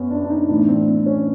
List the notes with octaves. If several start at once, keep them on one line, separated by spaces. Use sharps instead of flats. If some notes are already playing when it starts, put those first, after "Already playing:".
Already playing: F#2 B3 C#4
D4
D4
D#4
A2 E3 D4
C4
C4
C#4